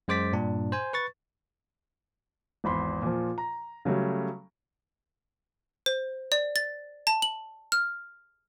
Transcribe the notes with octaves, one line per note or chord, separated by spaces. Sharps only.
F#2 G#3 C5 D6 A6 B6
G2 A#2 D4
C5 G#5
B4 C#6 A6
G#1 E2 B5 C6
A#2 F3
A#5
C#3 F#3 G3 A3
C5
D5
A6
A5
F#7
F6